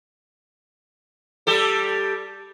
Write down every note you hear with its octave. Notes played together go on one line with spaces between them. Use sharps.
G3 G4 A4